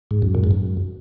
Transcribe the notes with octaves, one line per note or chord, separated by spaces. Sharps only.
G#2
F#2
A#2
G#2
F#2